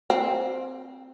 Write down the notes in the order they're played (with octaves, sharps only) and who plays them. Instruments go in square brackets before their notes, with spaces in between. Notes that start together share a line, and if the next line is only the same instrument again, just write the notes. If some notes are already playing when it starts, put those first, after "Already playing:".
[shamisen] C4